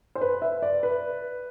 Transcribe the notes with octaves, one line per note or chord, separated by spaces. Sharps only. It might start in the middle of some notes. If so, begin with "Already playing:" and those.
C5
B4
E5
D5
B4